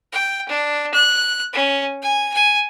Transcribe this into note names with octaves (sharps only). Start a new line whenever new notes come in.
G5
D4
F#6
C#4
G#5
G#5